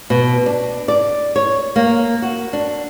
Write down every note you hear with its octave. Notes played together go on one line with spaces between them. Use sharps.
B2
D4
D5
C#5
A#3
F#4
D4